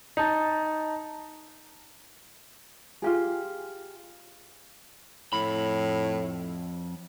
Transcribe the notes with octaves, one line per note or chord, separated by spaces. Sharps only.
D#4 A5
F4 G4 G#4
F2 A2 B5